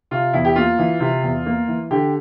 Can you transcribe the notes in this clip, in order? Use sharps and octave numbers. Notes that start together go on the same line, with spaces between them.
C3 F4
E2 E4
G4
A#3 F4
E3
C3
E2
A#3
E3
D3 G4